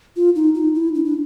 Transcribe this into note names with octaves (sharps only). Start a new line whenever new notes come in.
F4
D#4
D#4
E4
D4
D4